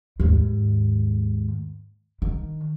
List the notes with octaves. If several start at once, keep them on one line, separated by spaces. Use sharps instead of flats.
D#2 G#2
D#3